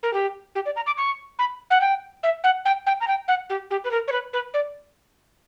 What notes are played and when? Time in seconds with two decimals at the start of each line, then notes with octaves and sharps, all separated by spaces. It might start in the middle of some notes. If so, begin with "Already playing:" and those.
0.03 A#4
0.13 G4
0.55 G4
0.66 D5
0.76 A#5
0.86 D6
0.97 C#6
1.39 B5
1.70 F#5
1.81 G5
2.23 E5
2.44 F#5
2.65 G5
2.86 G5
3.01 A#5
3.08 G5
3.28 F#5
3.49 G4
3.70 G4
3.84 B4
3.91 A#4
4.08 C#5
4.12 B4
4.33 B4
4.54 D5